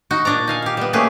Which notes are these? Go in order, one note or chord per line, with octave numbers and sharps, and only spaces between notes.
D#4 F#4
A#2 D4 D5 A#5
D#4 F5 G#5
G4 F5
G3 B3
A3 A#3 C#4 G4 G#4 B4